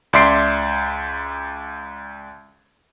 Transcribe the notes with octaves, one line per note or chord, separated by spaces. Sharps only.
C#2 D5 E5 C6 C7 D7